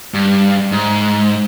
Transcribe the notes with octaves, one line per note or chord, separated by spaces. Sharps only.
G2
G#2